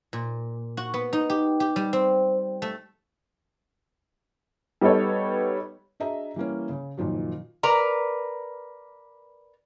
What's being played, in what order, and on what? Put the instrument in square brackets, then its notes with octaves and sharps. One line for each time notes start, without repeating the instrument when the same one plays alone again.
[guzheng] A#2
F#4
B3
D#4
G4
G4
G3
C4
A3
[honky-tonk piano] G3 B3 D#4 A4 C#5
[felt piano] D4 F#4 G#4 D#5 E5 A#5
E3 G3 A#3 C#4
C#3
F#1 A#2 D#3 F3 F#3
[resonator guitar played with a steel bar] A#4 B4 D5 A#5